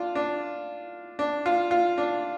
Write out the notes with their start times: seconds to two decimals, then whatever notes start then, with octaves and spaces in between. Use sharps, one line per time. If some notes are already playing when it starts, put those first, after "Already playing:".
Already playing: D4 F4
0.15 D4
1.19 D4
1.46 F4
1.71 F4
1.98 D4